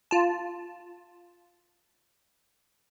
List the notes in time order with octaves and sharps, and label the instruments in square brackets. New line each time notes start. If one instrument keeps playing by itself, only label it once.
[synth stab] F4 A5